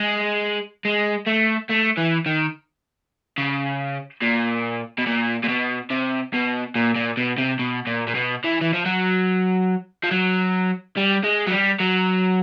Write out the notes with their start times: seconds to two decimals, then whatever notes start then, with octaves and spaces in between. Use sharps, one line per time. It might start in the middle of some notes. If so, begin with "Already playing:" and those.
Already playing: G#3
0.85 G#3
1.27 A3
1.69 A3
1.97 E3
2.26 D#3
3.38 C#3
4.22 A#2
4.98 B2
5.06 A#2
5.43 A#2
5.48 B2
5.90 C3
6.33 B2
6.75 A#2
6.96 A#2
7.17 B2
7.38 C3
7.59 B2
7.87 A#2
8.07 A#2
8.15 B2
8.44 E3
8.61 E3
8.73 F3
8.86 F#3
10.04 F3
10.11 F#3
10.97 G3
11.24 G#3
11.48 F#3
11.52 G3
11.80 F#3